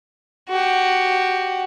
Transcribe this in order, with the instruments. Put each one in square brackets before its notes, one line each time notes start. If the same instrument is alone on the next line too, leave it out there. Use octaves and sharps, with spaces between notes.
[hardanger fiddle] F#4 G4